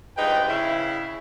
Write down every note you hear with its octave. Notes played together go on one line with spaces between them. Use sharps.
G2 F3 G#3 D#4 B4 G5
C#3 E4